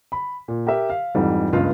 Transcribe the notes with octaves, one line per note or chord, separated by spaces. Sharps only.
B5
A#2
G4 A#4 E5
F5
F2 G#2 E3 G3
F#1 C#2 G2 F4